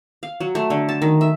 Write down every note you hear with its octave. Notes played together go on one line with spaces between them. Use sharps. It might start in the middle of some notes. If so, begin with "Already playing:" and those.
F5
F#3
A3
D3
A5
D#3
E5